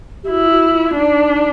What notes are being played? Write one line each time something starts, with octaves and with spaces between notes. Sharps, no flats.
G4
E4 F#4
F4
F#4
F4
D4 D#4